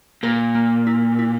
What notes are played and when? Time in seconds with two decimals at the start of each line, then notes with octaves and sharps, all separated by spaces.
0.23 A#2 A#4
0.55 A#3
0.87 E4
1.19 E4